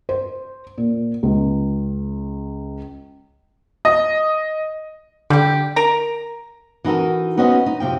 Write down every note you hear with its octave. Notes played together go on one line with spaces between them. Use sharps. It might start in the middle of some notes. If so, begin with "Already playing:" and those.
C5
A#2
C#2
D#5
D3 G3 G4
A#4 A#5
E3 D#4 F#4 A4 A#4
B3 C#4 F#4 C5 D#5
D#4
F#2 C3 F3 G5